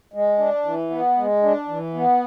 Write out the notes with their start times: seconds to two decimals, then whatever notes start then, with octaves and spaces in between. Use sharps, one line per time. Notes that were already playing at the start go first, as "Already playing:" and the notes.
0.14 G#3
0.39 D4
0.65 E3
0.90 B3
1.17 G#3
1.43 D4
1.69 E3
1.94 B3